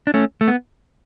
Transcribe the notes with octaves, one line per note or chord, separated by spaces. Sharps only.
D4
A3 C#4
A3
B3